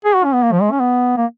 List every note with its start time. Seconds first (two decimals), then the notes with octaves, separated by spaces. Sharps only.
0.05 G#4
0.15 F#4
0.25 C#4
0.34 B3
0.43 A#3
0.52 F3
0.62 G#3
0.71 C#4
0.80 B3
1.17 A#3